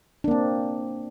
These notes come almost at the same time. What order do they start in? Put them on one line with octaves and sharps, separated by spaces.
D4 A#3 C4